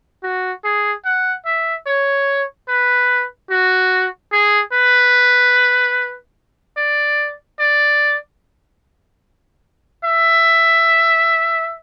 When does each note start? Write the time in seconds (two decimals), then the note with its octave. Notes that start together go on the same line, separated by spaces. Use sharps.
0.23 F#4
0.65 G#4
1.05 F#5
1.46 E5
1.87 C#5
2.69 B4
3.50 F#4
4.32 G#4
4.73 B4
6.77 D5
7.60 D5
10.05 E5